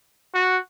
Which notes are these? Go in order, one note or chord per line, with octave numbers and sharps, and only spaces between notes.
F#4